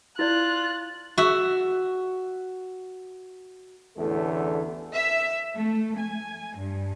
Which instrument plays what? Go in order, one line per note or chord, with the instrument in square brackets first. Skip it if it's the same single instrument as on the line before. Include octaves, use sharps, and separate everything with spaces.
[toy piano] E4 D5 [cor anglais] F4 [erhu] F#6 [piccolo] A6
[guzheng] F#4 E5
[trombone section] A1 E2 A2 D3 A3 A4
[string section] E5
A3
G#5
G2